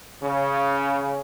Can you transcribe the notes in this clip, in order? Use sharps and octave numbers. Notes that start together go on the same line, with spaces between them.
C#3